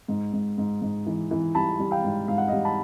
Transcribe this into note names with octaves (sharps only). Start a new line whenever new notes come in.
G#2
G#2
G#2
G#2
E3
E3
G3 A5 B5
G3
F5 G5
G#2
G#2 F5
F#5
G3 D#5 F5
A5 B5